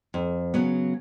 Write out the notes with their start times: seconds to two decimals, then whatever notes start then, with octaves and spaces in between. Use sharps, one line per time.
0.14 F2
0.54 C#3 F#3 B3